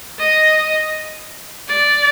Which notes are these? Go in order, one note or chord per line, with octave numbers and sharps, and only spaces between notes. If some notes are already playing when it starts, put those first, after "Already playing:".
D#5
D5